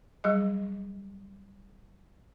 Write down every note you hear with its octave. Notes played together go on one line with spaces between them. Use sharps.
F#3 G3 G#4 D#5